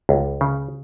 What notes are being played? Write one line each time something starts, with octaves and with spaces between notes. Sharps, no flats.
C#2
C#3